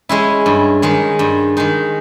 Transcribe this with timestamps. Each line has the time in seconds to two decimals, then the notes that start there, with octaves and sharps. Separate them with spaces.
0.09 G#3 C#4 E4
0.46 G2
0.82 D#3 G#3 D#4
1.19 G2
1.57 D#3 G#3 D#4